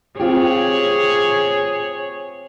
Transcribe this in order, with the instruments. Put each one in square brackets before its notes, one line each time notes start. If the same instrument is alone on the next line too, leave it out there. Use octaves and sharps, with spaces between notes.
[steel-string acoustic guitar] C4 F4 G4 [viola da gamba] G#4 C#5